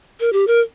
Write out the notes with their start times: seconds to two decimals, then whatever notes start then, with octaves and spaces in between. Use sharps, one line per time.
0.20 A#4
0.33 G4
0.47 A#4